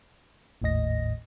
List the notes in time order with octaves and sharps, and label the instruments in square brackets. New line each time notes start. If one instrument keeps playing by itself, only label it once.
[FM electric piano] G#1 D#2 A2 D#5 A#6